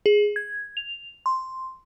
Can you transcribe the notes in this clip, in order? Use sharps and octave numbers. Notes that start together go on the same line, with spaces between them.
G#4
G#6
F7
C6